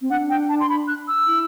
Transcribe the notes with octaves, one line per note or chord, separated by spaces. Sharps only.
C4
D4 F#5
G5
A5
C6
B5
F#6
E6
E4